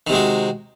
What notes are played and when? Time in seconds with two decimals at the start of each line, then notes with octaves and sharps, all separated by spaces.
0.07 D#3
0.09 C3
0.12 G#3
0.15 F#4